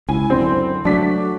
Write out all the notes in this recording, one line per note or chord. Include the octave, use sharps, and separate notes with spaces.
C#2 E4 G#5
F#2 D3 C4
F#3 G#3 A3 D4 F#4 B6